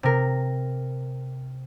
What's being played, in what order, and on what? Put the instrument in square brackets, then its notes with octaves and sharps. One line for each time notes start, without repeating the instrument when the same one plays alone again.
[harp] C3 A#4